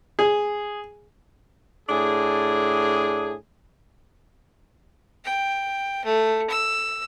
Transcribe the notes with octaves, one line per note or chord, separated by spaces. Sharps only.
G#4
A2 D4 G#4
G5
A3
E6